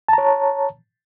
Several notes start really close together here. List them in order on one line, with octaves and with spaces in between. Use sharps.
A5 A#5 C#5